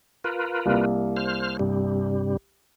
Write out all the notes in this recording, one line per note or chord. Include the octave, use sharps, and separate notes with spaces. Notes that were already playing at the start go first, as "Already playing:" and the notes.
F4 A#4 B4
C2 A#3
C5 F6
G2 C3 G3